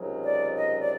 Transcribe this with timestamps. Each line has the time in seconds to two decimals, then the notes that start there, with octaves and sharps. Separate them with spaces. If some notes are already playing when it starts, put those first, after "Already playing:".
Already playing: C#2 C3 D#3 F#3
0.24 D5
0.56 D#5
0.79 D5